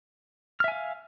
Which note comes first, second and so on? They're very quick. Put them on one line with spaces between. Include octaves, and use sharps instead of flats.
F6 E5 G#5 F5